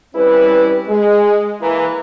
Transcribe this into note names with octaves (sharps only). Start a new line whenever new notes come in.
G3 C4 C#4 E4 B4
G#3
E3 A#3 B4 A#5